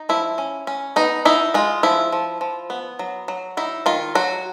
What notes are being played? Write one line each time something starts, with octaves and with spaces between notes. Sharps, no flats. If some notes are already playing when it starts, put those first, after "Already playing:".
Already playing: D#4
F3 E4
C#4
C#4
B3 D#4
D#4 E4
G#3 F4
F3 E4
F3
F3
B3
F#3
F#3
D#4 E4
D#3 F4
F#3 F#4